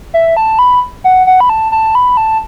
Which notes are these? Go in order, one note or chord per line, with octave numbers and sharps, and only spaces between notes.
E5
A5
B5
F#5
F#5
B5
A5
A5
B5
A5